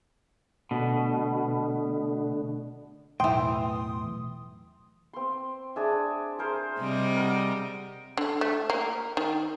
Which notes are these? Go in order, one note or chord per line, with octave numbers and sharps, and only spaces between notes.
B2 D3 A3 D4
B1 E2 A2 E3 G5 C6 D#6
C4 C6
D4 G#4 E5
G#4 A#4 C5
C3 G3 D#5
A#4 F#5
D3
A3
A#3
D#3